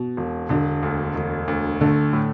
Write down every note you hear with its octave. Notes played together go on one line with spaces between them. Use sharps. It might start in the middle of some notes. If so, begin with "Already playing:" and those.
Already playing: B2
E1
E1 D3
D2
E1
D2
D3 A3
A2